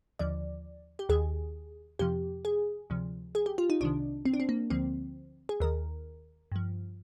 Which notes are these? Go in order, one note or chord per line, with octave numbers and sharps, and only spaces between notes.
D#2 D3 F3 D5
G4
D#2 D#3 G#4
F2 C3 F3 G4
G#4
D2 C3 F3
G#4
G4
F4
D#4
C2 C3 D#3 D4
C4
D4
C4
A#3
D2 D3 F3 C4
G#4
D#2 D#3 A#4
G2 F3